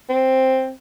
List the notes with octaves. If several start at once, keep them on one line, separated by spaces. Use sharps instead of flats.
C4